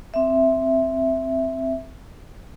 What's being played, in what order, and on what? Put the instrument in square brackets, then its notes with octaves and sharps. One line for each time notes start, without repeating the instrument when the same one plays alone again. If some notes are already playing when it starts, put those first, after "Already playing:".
[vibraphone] C4 E5